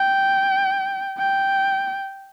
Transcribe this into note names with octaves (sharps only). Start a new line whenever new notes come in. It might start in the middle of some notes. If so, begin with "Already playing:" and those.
Already playing: G5
G5